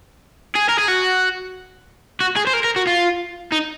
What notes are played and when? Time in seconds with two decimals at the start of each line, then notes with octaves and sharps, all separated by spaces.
0.56 G#4
0.69 A#4
0.79 G#4
0.88 F#4
2.21 F#4
2.36 G#4
2.47 C5
2.53 A#4
2.64 A#4
2.76 F#4
2.87 F4
3.52 D#4